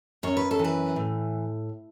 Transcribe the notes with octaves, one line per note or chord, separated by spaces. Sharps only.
F#2 C#5
B4
A4
E3
B4
A2